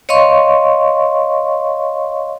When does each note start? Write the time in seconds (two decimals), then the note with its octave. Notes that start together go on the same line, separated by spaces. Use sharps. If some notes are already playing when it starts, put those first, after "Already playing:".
0.09 C#5 D#5 F5 C6 C#6